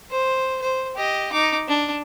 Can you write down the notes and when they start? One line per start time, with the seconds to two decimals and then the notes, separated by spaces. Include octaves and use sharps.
0.11 C5
0.62 C5
0.96 G4 D#5
1.32 D#4 D6
1.68 D4